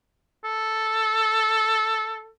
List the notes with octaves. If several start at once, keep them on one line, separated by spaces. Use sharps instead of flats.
A4